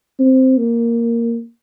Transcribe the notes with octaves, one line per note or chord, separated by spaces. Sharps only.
C4
A#3